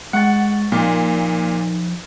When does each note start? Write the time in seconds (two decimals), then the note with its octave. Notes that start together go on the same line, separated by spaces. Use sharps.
0.13 G#3 F#5 C#6 A6
0.72 A#2 F3 D#4